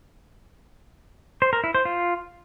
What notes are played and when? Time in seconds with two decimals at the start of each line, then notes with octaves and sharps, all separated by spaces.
1.42 C5
1.53 A#4
1.64 E4
1.75 C5
1.85 F4